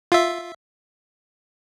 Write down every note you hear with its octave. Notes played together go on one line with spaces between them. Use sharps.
F4 E5